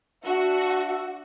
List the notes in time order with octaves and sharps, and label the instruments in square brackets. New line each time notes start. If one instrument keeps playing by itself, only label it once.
[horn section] D4 E5 [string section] F#4